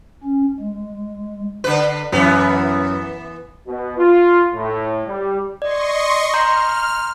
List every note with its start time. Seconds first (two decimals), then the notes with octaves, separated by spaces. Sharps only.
0.23 C#4
0.59 G#3
1.64 D3 B4
2.12 F#2 E3 B3
3.67 B2
3.98 F4
4.54 A2
5.06 G3
5.62 D5 D#5 C6 C#6
6.34 A#5 C6 F6 G6